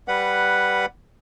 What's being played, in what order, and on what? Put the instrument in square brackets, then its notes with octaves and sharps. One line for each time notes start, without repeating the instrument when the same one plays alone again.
[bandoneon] G3 B4 F#5